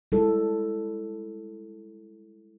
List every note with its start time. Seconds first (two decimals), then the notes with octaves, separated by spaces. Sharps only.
0.12 G3 G#3 E4 A4